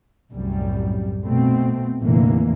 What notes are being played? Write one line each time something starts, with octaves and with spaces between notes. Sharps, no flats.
C2 F#2 A2 G3
B2 A3 C4
F1 A#1 A#2 D3 E3 A#3